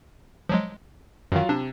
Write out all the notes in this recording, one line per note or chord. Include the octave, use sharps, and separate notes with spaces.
F3 F#3 G#3
F#2 D#3 F#3 F4 F5
C3 D4